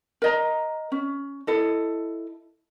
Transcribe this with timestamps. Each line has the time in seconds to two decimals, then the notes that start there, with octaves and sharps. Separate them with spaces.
0.22 A#4 D#5 A#5
0.92 C#4
1.47 E4 A4 D#5